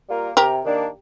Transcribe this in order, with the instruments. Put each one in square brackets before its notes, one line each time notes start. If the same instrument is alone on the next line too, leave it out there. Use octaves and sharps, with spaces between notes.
[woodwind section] G3 A#3 F4 A#4
[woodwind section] C3 [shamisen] G4 A#4
[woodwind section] D#3 A#3 D4